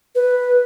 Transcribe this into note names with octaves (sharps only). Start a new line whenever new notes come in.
B4